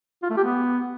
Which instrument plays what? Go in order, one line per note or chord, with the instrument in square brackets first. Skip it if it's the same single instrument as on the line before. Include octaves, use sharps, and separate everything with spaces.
[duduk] F4
A3
G4
B3